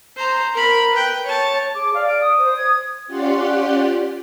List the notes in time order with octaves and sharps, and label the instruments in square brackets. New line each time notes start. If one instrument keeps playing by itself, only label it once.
[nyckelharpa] C5 A#5
A#4 B5
B4 G5
C#5 A5
[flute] G#4 [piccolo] D6
[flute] D5 [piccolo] F5
[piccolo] D7
D#6
[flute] C5
G#6
[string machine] C#4 F4 G4 D5 F#5 C6